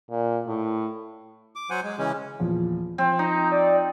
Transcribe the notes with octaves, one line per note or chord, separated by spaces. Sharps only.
A#2
A2
D6
F#3 C5 F#5 G#5
G#3
C#3 E3 G#3 C#4
E2 A#2 F3
F3 C4
D#4 A#5
D5